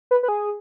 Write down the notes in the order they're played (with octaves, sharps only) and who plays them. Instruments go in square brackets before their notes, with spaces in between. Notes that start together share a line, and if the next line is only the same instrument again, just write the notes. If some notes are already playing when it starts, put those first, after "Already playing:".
[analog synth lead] B4
B4
G#4